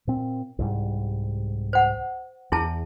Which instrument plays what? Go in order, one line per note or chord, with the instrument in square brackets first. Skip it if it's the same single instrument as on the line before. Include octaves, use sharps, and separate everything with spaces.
[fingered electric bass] A#2 C4
C2 G#2 G3
[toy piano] C5 F#5
[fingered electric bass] E2 [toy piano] E4 G#4 A5